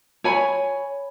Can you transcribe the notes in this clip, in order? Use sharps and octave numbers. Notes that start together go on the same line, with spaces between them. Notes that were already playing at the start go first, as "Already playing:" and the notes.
C#5 G#5 B5